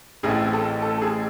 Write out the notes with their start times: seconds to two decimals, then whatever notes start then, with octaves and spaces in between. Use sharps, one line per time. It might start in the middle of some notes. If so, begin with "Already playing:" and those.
0.23 A1 A2 E3 A3 C4 G#4
0.53 A4
0.82 A4
0.98 A4
1.02 G#4